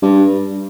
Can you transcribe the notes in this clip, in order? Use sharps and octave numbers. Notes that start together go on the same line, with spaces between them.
G2